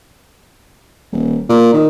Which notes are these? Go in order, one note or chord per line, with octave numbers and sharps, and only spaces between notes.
D#1
A#2
D#3